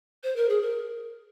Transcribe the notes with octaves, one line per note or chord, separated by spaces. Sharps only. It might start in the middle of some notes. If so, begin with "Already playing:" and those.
C5
A#4
G#4
A#4